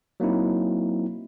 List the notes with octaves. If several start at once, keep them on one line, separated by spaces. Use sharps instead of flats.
F#3 A#3 C4 D#4 E4